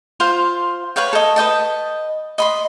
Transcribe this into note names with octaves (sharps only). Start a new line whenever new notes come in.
F4 C5 F5
B4 C#5 F5 G5
A4 D#5
B4 D#5 G5 A5
D#5 B5 C6